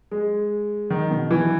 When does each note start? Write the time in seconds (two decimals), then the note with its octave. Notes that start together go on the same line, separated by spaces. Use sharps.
0.11 G#3
0.90 D#3
1.11 B2
1.31 E3